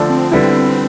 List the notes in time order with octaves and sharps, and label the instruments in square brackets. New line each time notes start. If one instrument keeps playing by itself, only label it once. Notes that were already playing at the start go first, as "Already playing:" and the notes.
Already playing: [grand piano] D3 F3 A3 D4
[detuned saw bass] C4
[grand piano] D3 G3 B3 E4 [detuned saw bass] C4